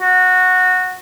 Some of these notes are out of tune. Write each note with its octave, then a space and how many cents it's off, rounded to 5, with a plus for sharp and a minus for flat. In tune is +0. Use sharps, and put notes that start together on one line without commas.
F#4 -10